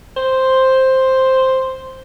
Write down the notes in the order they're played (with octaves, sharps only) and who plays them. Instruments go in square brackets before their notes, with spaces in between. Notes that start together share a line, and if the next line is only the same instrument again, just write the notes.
[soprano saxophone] C5